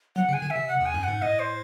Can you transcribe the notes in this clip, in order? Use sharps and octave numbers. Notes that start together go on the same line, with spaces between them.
F#3 F#5
C#3
G#5
D#3
E5
C3
F#5
E2
G#5
F#2
G#2 F#5
A2 D#5
C5